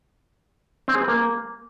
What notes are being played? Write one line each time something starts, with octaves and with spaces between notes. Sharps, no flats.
C4
G#4
B4
A#3